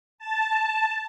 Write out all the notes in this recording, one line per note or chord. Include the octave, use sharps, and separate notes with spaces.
A5